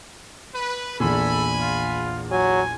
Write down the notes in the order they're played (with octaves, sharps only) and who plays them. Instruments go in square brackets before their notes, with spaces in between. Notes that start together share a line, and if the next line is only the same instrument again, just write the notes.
[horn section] B4
[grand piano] A#1 E2 A#2 [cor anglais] A4 [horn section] G#5 B5
[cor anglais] F4
[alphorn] F#3 [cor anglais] G#5